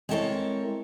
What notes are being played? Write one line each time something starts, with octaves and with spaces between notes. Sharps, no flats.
G#3 C4 E4 A4 A#4 C#5